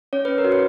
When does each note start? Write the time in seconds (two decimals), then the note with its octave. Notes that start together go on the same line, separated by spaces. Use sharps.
0.13 C#4 C#5
0.25 C#4 B4
0.38 A#4
0.44 F#4
0.52 B4